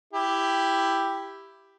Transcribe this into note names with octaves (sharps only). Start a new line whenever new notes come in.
E4 G4